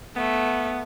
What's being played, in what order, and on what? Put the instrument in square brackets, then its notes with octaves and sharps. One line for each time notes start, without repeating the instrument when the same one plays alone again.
[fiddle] A3 [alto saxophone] B3